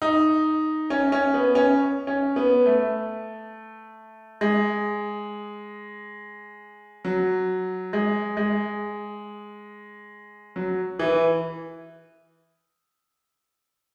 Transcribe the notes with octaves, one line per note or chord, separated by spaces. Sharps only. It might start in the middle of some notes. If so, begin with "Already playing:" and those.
D#4
C#4
C#4
B3
C#4
C#4
B3
A3
G#3
F#3
G#3
G#3
F#3
E3